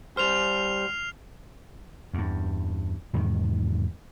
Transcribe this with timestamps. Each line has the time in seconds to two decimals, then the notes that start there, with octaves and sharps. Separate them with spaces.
0.17 G3 C5 F6 C7 F7
2.14 E2 G2
3.13 E2 G#2 C3 D#3